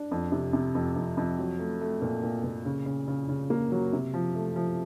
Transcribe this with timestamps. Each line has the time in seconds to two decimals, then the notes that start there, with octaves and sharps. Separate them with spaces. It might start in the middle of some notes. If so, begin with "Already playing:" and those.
Already playing: D4
0.11 F2
0.32 C3
0.53 C3
0.75 F2
0.96 F2
1.17 F2
1.39 F#3
1.59 A3
1.81 A3
2.02 A#2
2.23 A#2
2.44 A#2
2.65 C#3
2.86 C#3
3.08 C#3
3.29 C#3
3.50 A#3
3.72 F#3
3.93 C3
4.14 F3
4.35 A3
4.56 F3